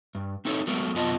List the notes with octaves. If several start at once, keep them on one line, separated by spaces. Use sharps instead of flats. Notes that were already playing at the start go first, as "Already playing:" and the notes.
G2
C4 D#4 E4 A4 C#5
F#3 G#3 A3 B3 F#4 A#4
F#2 C3 B3 F4 D#5 A5